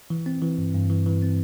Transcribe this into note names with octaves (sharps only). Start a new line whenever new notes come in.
E3
C4
E3
G2
G2
E3
E3
C4